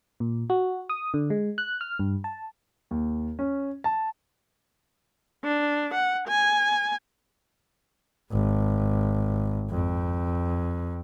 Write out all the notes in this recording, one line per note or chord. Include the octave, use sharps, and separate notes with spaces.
A#2
F#4
D#6
D3
G#3
F#6
F6
G2
A5
D#2
C#4
A5
D4
F#5
G#5
G#1
F2